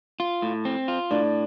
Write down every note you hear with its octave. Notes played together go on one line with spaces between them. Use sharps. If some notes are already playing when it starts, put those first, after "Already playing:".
F4
A2
C4
F4
A2 D4